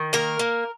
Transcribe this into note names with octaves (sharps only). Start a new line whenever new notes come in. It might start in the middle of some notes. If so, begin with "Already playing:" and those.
Already playing: D#3
A#3 A#4
A#3